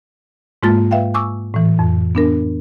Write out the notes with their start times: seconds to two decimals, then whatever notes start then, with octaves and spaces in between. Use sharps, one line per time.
0.63 G#2 G#3 A#3 F4 A5 A6
0.91 B4 E5 F5 G5
1.14 G#5 C#6 D6 E6
1.54 A2 E3
1.79 F2
2.15 B3 D4 A#4